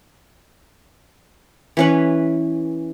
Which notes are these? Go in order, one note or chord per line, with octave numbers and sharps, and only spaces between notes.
E3 C#4 B4